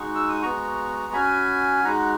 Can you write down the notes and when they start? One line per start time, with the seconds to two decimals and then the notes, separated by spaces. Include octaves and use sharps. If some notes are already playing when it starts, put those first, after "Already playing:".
Already playing: G#3 D#4 F#4 C#6
0.15 E6
0.29 D#6
0.42 G#3 B3 F#4 A#5 C#6
1.13 C#4 F#4 G#5 B5
1.84 G#3 D#4 F#4 F#5 A#5